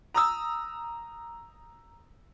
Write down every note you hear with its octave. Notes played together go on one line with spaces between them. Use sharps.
A#5 D#6 E6